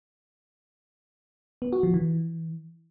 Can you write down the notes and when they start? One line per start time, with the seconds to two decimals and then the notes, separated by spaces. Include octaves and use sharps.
1.62 B3
1.73 F#4
1.83 F3
1.94 E3